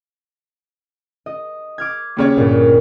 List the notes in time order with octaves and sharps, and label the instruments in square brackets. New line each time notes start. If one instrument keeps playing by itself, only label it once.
[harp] D#5
D6 F6 G#6
[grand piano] D#2 C#3 C#5
[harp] G1 A#2